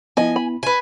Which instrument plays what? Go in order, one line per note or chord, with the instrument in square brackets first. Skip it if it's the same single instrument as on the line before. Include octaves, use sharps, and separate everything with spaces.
[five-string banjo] F3 D#5 [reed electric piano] B3 E4 [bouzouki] G#5
[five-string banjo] B5
[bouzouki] B4 G#5